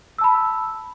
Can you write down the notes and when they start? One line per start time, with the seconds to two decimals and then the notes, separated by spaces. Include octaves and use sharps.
0.18 E6
0.21 A5
0.24 B5